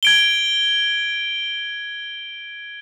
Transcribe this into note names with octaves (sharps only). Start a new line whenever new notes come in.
G#6 D7 G7